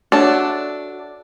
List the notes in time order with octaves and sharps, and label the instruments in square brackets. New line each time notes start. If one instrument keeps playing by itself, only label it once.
[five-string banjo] D4 A4 [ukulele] F#4 C#5 E5